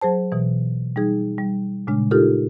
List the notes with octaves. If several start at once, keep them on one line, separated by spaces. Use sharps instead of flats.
F#3 G#4 C5 A5
B2 E3
G3 D#4 G#4
G3
A#2 C#3 G#3 D4
D#4 F4 G4 A4 A#4